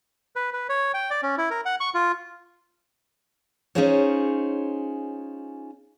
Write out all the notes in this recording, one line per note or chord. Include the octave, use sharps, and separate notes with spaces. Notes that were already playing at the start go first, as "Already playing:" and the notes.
B4
B4
C#5
G5
D5
C#4
E4
A#4
F#5
C#6
F4
C#4 D#4 F4 G#4 C5 C#5